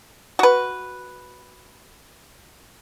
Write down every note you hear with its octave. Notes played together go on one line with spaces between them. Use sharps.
F#4 B4